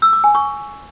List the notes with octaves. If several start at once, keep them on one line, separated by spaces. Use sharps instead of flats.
E6
D6
G#5
C#6